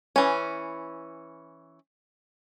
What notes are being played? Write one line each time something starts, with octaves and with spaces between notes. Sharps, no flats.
E3 C#4